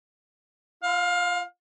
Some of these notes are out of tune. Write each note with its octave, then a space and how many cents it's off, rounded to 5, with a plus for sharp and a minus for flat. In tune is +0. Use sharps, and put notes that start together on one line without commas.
F4 -30 F5 +25